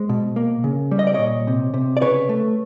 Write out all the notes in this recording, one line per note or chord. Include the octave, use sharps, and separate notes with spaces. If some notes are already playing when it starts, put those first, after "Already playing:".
Already playing: G#3 C5
B2
A#3
C#3
G3
D#5
D5
A#2 C#5 D#5
C3
C3
D5
C#3 B4 C#5
A3